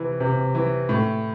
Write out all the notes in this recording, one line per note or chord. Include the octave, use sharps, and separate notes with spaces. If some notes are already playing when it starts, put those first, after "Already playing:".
Already playing: C3 E3
C3
E3
A2